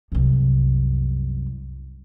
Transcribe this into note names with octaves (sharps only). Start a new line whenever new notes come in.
C2 F#2